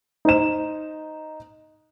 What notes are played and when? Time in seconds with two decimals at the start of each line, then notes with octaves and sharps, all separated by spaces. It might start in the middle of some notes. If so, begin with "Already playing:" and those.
0.25 D#4 C5 E7